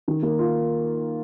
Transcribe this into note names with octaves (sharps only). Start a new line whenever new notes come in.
D#3
A#3
F4